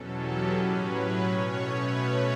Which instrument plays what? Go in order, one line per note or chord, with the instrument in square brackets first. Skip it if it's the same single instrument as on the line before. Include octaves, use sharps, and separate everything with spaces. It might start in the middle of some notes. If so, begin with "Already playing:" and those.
Already playing: [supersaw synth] E2 B2 F#3 C#4 A4
G4
A2 F#3 C#4 B4
C#5
B2 A3 C#4
B4